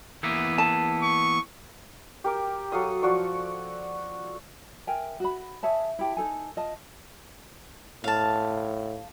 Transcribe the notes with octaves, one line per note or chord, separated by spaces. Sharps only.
E3 A#3 B3
A5
C#6
G4 A#4 D6
F#3 A4 F5 D#6
F3 F#4 D5 C#6
A#4 E5 G5 G#5
F#4 B5
G#4 C#5 E5 A5
E4 G4 A5
D#4 G#4 A4 G#5
F4 D#5 A5
A2 F5 A5